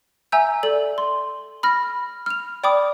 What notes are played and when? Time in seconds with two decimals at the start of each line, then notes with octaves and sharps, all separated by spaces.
0.32 E5 G#5 A#5 E6 G6
0.63 A4 D5 F#7
0.98 C6
1.63 B5 F6 A#6
2.26 F6 F7
2.64 D5 G5 B5 D6 D#6